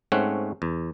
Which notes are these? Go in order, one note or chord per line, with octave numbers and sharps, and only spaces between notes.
G#2 A3 C4 C#4 C#5 F#5
E2